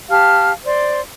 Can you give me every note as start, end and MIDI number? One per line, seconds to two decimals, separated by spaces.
0.09 0.53 67
0.09 0.53 77
0.09 0.53 81
0.09 0.53 89
0.65 1.01 72
0.65 1.01 74
0.65 1.01 84